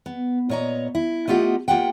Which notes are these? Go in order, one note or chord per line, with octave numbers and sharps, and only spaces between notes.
B3
A#2 B3 C#5 D#5 A#5
E4
A3 B3 F4 G4 D#5 F#5
A#3 F4 G4 F#5 G5